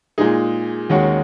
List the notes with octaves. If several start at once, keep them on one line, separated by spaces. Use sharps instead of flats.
A#2 G#3 D#4 G#4
D#2 D#3 G#3 C#4 F#4